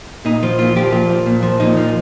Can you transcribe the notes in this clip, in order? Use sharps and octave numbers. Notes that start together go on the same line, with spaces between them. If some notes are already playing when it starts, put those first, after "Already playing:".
A#2 D#4
F3 F4
A#2 F4
F3 G4
A#2 F4
F3
A#2
F3
A#2 D#4
F3